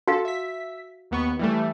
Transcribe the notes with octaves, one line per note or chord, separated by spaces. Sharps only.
F#4 A4 F5
E5 B6
D#2 B3 C#6
E3 G3 A3